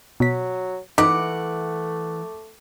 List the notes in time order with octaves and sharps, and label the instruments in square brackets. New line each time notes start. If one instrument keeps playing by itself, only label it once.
[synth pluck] B2 B6 [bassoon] F#3
[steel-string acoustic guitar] E3 F#5 [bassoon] A3 [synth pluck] D#4 B6 [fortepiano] D6